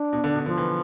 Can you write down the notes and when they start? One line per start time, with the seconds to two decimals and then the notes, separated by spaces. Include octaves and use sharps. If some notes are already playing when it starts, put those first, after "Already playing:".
Already playing: D4
0.13 B2
0.24 D3
0.35 B2
0.46 D3 F3
0.58 E3